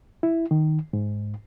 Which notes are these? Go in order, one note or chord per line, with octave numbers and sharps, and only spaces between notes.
E4
D#3
G#2